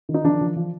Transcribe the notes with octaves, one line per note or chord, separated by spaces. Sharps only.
D#3
D#4
F3 D4
F3
F3